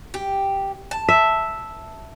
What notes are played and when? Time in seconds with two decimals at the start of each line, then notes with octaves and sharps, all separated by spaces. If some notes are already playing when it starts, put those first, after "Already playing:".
0.14 G4
0.91 A5
1.09 E5